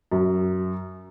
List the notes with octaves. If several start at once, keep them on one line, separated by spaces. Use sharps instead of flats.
F#2